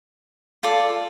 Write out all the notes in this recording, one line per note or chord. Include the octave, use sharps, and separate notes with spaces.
F4 A4 D5